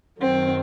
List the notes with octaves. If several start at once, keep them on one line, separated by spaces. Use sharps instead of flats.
F#2 D#3 F#3 C4